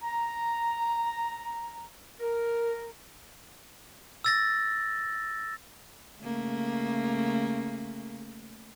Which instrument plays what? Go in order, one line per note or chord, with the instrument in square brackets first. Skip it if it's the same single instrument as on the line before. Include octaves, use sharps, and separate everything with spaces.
[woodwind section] A#5
A#4
[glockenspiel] E6 A6 A#6
[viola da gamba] C#3 A3 A#3